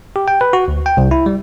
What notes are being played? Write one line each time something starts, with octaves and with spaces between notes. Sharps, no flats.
G4
G5
B4
F#4
D2
G5
C2
E4
G3